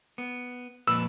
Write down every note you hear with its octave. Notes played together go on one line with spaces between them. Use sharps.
B3
F2 A#2 B4 E6